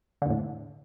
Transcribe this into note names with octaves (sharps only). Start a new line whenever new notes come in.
E2 A2 D3